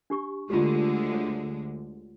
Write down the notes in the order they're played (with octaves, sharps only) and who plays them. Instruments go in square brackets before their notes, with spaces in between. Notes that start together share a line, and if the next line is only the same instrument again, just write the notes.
[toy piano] D4 G4 C#6
[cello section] D2 D3 G#3 [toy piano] F4 G4
[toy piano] C#5